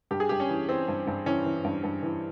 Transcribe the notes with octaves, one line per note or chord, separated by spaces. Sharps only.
G2 G4
G#4
G2 G4
C#4
E3
E3 C4
G2
G2
E3 C#4
E3
G2
G2
E3